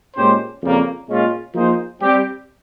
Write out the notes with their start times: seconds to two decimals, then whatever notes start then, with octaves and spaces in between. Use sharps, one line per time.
0.16 A#2 G#3 C#4 G4 C5
0.62 F2 C#3 G3 A#3
1.07 A#2 G#3 C#4 F4
1.54 F3 A#3 D#4 G#4 C5
1.99 G3 C4 G4